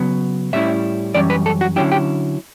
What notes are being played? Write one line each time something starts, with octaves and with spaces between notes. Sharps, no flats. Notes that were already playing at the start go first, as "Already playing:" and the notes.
Already playing: C#3 F#3 B3
A2 G3 C#4 E4 E5
F#2 E3 G3 C#4 D5
B4
A4
F#4
D3 F#3 C#4 E4 G4
G4